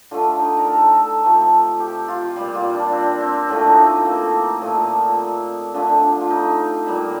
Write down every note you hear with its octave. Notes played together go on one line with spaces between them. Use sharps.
D3 A3 F4
D#4
A#4
A4
A4
C3 F3 A3
G4
F4
A#2 G3
F4
D4
C4
C4
A2 F3 A3 D4
D#4
C4
A#3
A#2 F3 A3
C4
D3 F3 A3 D4
F4
D#4
A#2 G3